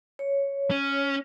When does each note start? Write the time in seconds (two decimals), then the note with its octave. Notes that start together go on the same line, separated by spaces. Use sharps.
0.19 C#5
0.71 C#4